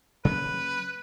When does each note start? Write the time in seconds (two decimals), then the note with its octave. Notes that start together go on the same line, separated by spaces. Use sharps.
0.25 C#3 F#3 A#3 B4